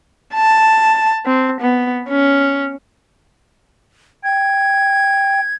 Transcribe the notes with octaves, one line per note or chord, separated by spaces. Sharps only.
A5
C4
B3
C#4
G5 G#6